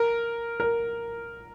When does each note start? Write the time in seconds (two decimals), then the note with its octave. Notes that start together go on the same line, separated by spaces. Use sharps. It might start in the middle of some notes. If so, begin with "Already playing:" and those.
Already playing: A#4
0.60 A#4